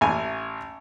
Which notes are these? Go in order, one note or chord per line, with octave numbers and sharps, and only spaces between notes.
A1 G#5